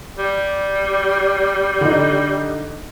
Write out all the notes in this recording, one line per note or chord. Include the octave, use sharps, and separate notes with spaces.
G3
D3 D#4